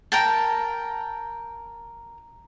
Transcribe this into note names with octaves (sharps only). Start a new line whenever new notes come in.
A#4 G5 A5